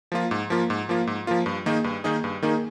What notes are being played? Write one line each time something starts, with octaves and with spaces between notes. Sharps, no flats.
F3 A#3 F4
G#2
F3 A#3 F4
G#2
F3 A#3 F4
G#2
F3 A#3 F4
G2
D#3 A#3 D#4 G#4
G2
D#3 A#3 D#4 G#4
G2
D#3 A#3 D#4 G#4